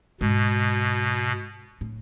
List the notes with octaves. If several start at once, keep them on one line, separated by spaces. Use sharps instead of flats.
G#2 B2
A2